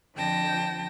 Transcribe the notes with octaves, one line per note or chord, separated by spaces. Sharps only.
F2 D3 F3 G5 A5 A#6